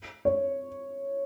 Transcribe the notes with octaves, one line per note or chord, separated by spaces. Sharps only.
C#5